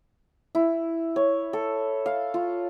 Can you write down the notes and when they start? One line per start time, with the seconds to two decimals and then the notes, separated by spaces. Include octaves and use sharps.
0.55 E4
1.16 C#5
1.53 A4
2.06 F5
2.34 F4